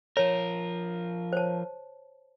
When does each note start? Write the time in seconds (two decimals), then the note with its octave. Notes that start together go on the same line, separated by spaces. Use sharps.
0.17 F3 A#4 C#5
1.33 C5 C#5 A5